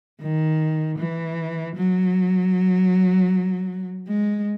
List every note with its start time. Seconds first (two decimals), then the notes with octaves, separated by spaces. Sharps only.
0.22 D#3
0.99 E3
1.76 F#3
4.08 G#3